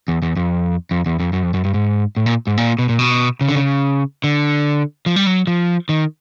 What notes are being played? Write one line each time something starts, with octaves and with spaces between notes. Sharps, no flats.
E2
E2
F2
F2
E2
F2
F#2
F2
F#2
G2
G#2
A2
A#2
G#2
A#2
B2
A#2
B2
C#3
D3
C#3
D3
F3
G3
F#3
F3
D#3